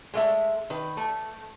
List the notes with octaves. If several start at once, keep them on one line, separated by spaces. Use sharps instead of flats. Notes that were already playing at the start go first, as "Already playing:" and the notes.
G#3 A3 E5
D#3 B4
A3